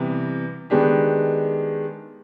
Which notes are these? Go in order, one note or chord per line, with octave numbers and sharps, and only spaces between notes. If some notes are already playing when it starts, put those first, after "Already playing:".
Already playing: C3 E3 G3 B3
D#3 G#3 B3 D4 G4